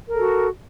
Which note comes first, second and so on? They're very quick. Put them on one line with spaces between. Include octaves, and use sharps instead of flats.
A#4 A4 F#4